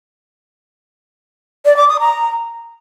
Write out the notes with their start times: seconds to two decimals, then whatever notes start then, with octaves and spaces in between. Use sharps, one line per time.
1.65 D5
1.77 D6
1.88 D#6
2.00 A#5